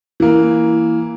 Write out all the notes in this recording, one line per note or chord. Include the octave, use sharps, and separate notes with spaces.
E3 A#3